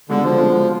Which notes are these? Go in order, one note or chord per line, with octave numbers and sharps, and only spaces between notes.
C#2 B2 D3 G#3
F3
C#2 B2 G#3